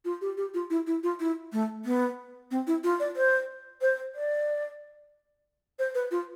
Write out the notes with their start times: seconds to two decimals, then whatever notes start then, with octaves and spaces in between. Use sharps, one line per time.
0.05 F4
0.21 G4
0.37 G4
0.54 F4
0.70 E4
0.87 E4
1.03 F4
1.20 E4
1.53 A3
1.85 B3
2.51 C4
2.67 E4
2.84 F4
3.00 D5
3.16 C5
3.81 C5
4.15 D5
5.79 C5
5.95 B4
6.11 F4